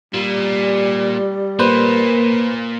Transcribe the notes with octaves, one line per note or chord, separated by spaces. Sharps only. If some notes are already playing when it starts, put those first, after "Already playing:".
A#2 G3
A#2 A#3 B4 C5